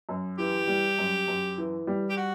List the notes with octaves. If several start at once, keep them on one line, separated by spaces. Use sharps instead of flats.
F#2
E3 G4
G3
F#2
F#2
E3
G3
G4
F#4